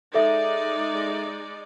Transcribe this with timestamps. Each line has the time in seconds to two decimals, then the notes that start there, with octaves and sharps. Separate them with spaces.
0.14 G#3 D#4 A4 D5 E5